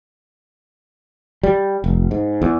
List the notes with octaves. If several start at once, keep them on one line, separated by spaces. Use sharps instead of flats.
G3
F1
G#2
E2